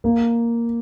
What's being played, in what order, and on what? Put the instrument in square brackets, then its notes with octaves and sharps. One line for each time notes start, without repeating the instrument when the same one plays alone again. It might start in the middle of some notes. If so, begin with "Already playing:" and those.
[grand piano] A#3